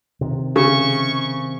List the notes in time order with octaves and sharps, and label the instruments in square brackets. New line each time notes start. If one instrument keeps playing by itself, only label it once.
[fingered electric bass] C3 D#3
[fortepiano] C#3 [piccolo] C#6